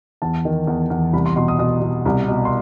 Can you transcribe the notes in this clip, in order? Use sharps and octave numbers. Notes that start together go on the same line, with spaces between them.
E2 A5
D#3
E2
E2
C2 B5
C6
B2 C6
D#6
B2 D#6
B2
C2
B2
C6